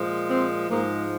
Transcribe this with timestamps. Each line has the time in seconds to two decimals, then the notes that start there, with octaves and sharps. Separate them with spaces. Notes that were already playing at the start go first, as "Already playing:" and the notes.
Already playing: A#2 F3 G#3
0.27 C4
0.68 G#2 F3 G#3 A#3